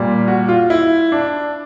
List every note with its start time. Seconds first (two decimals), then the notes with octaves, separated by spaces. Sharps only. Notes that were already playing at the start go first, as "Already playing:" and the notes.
Already playing: A#2 G3
0.28 F#4
0.48 F4
0.70 E4
1.12 D4